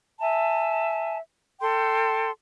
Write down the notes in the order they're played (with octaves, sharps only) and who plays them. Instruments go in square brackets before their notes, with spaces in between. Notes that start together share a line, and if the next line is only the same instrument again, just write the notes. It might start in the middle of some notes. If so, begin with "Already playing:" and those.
[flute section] E5 G#5 A5
A4 G5 C6